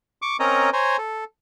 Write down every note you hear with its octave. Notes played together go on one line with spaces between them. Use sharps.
C#6 D6
C4 C#4 A#4 C#5 D#5 A#5
C5 C#5 G#5 A#5
A4